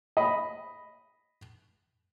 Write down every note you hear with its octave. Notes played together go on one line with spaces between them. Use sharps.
D#5 B5